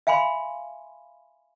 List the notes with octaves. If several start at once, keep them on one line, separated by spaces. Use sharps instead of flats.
E5 F5 G#5 B5 C6